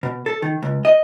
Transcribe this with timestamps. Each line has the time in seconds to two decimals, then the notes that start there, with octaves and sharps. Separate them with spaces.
0.03 B2
0.26 A4
0.42 D#3
0.62 C#2
0.85 D#5